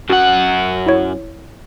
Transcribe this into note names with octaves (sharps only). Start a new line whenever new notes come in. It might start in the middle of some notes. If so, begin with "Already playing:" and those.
F#2 F#4 F#5
E4 C#5